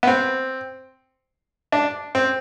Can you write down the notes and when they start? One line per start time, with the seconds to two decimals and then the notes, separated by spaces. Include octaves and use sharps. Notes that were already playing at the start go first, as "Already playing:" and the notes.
0.03 B3
0.07 C4
1.72 D4
2.15 C4